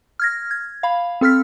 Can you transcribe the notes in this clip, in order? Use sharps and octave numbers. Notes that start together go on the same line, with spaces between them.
F6 G#6 A#6
G#6
F5 B5
C4 A4 E6 F6 B6